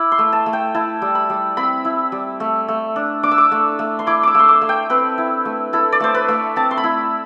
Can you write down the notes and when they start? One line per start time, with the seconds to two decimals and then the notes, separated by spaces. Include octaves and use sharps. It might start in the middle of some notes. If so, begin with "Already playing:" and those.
Already playing: E4 D6
0.12 C6
0.19 A3
0.33 A5
0.46 A3
0.53 G5
0.75 E4 A5
1.02 G3
1.15 B5
1.30 G3
1.57 C4 B5
1.85 E4
2.12 G3
2.40 A3
2.68 A3
2.96 D4
3.23 D4 D6
3.31 E6
3.38 D6
3.52 A3
3.79 A3
3.99 C6
4.07 E4 D6
4.23 D6 E6
4.35 A3 C6
4.48 D6
4.61 A3
4.69 G5
4.90 C4 B4
5.18 E4
5.45 A3
5.73 E4 A4
5.92 D5
6.00 A3 C5
6.15 B4
6.28 A3
6.56 C4 A5
6.71 C6
6.78 B5
6.84 E4